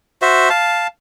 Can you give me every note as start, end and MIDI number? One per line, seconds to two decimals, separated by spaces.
0.22 0.49 66
0.22 0.49 72
0.22 0.49 76
0.50 0.87 77
0.50 0.87 81